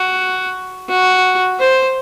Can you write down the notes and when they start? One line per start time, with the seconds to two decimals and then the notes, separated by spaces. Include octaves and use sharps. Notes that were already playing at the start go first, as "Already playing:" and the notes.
Already playing: F#4
0.89 F#4
1.60 C5